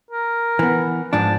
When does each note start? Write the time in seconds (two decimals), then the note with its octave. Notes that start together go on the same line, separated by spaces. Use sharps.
0.11 A#4
0.59 E3 B3
1.13 G#2 F3 D4 A5